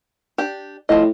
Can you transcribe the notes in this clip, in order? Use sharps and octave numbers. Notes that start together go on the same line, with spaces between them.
D4 G4
A2 F3 D#5